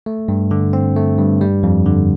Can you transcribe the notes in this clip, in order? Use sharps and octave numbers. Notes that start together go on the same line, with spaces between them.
A3
G2
D3
C4
A3
G2
G3
F2
D3